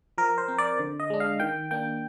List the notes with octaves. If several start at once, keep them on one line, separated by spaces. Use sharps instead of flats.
F3 A#4
C5
C4
D5
D3
D#5
G#3 D4
F5
D#3 G5
A#3 D4 G5